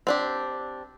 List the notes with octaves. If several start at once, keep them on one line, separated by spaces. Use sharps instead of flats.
C4 D4 G4